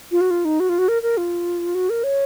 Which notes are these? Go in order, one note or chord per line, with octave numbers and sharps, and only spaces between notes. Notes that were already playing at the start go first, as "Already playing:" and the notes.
F4
F#4
F4
D#4
F#4
F4
F#4
A#4
A#4
F4
F#4
A#4
C#5